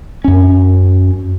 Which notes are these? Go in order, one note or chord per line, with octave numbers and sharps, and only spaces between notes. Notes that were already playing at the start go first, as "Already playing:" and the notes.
F#2 C#4